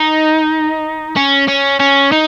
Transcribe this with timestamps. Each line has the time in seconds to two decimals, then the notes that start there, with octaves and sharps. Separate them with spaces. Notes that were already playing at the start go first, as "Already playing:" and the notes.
Already playing: D#4
1.16 C#4
1.48 C#4
1.80 C#4
2.12 D#4